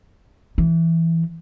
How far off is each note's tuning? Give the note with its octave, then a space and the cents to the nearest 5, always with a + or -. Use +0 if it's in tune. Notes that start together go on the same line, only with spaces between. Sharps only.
E3 +5